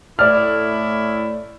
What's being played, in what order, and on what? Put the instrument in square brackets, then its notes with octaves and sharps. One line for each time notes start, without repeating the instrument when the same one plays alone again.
[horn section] A2 A3 E4 [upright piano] D5 F6